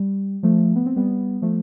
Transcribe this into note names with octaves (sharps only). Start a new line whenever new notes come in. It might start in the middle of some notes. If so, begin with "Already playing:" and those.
Already playing: G3
F3 A3
B3
C4
G3 B3
F3 A3